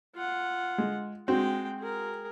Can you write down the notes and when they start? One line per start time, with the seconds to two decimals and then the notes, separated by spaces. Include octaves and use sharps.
0.15 F4 F#5
0.78 G#3
1.28 G#3 C4 F#4 G5
1.79 G#4 A#4